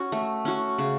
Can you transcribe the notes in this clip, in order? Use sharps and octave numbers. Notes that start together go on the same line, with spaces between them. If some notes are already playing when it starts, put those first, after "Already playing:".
Already playing: C#4 F#4
A3
C#4 F#4
C#3